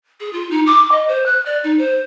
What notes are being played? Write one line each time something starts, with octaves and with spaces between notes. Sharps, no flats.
G#4
F4
D#4
D6
D#5
C5
F#6
D5
D#4
C5